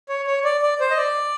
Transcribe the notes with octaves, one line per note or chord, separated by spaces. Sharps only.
C#5
C#5
D5
D5
C5
D#5
D5